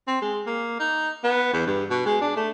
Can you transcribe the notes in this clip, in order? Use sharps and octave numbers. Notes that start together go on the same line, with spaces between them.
C4
G#3
A#3
D#4
B3
E2
G2
B2
G#3
D4
A3